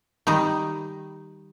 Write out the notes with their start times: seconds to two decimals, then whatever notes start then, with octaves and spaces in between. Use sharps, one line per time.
0.27 D#3 G3 D#4